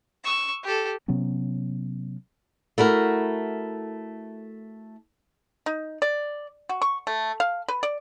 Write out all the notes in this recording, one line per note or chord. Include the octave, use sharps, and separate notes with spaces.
C#6 E6
G4 A4
C3 F#3 B3 C#4
A3 E4 F#4 A#4
D#4
D5
F#4
C#6
A3
F5
B4
D5